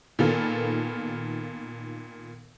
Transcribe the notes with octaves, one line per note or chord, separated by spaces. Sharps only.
A#2 D#3 B3 F4 A4